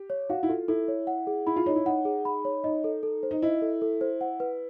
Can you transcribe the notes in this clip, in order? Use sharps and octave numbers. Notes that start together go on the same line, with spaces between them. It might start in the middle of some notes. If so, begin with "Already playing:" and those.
Already playing: G4
C#5
F#4 F5
E4
F4 A4
E4 A4
C#5
F#5
G#4
E4 B5
F4
D#4 C#5
E4
D#4 F#5
G#4
B5
C#5
D#4 D#5
A4
A4
C5
D#4
E4 D#5
A4
A4
C5
F#5
B4